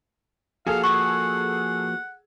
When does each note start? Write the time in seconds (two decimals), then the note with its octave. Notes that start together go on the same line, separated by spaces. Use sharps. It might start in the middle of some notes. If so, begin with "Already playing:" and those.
0.67 F3 A#3 F#4 G#4 A4 F5
0.84 F#5 C#6